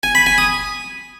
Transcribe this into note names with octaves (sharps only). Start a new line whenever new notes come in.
G#5
B5
G#5
D#6